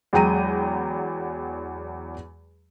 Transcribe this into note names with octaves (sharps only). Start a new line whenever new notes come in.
E2 F#3 G#3 G5 A#5 D#7